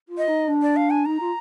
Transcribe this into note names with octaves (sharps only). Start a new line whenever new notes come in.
F4
D#5
D#4
D4
D5
F5
G#5
D#4 A#5
F4